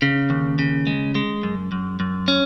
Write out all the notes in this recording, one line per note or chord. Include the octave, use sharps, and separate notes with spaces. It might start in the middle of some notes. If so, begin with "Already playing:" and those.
C#3
D#2
C#3
G#3
G#3
F#2
F#2
F#2
C#4